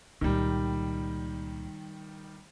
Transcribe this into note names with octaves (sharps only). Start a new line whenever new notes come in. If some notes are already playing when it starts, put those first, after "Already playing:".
C#2 A#2 D#3 G3